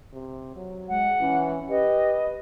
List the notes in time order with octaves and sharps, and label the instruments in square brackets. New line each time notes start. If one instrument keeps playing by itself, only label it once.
[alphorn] C3
F#3
[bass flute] G#3 [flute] F#5
[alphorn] E3 [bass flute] C#4
[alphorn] G4 [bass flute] B4 [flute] D#5